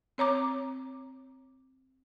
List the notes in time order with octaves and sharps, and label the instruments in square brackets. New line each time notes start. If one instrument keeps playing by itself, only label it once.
[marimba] C4 C#5 A#5 D6